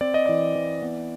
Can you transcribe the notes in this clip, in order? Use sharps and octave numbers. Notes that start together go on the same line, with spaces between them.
C4 D5
D#5
E3 D5
E3
B3